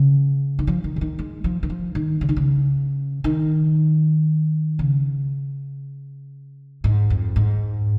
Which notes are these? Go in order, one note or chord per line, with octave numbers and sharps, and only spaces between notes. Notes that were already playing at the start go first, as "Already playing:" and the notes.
Already playing: C#3
D#3
F3
D#3
C#3
D#3
G#3
F3
D#3
F3
D#3
C#3
D#3
C#3
D#3
C#3
G#2
F2
G#2